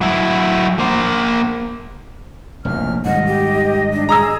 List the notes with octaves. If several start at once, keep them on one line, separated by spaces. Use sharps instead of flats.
F#3 E4
A#3 C5
F1 A#1 A2 F6
G#2 D#3 G3 D#5 F#5
G4
D4
G#4 A#5 D#6 E6